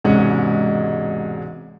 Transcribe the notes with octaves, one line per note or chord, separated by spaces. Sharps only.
E1 G#2 C3 G#3 C#4 F#5